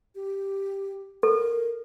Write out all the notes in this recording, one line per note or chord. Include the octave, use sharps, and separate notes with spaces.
G4
A4 A#4